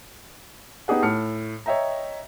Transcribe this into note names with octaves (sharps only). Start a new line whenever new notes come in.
B3 D#4 G4 G#4 F#5
A2 A5 F6 C#7
C#5 D#5 E5 G5 A#5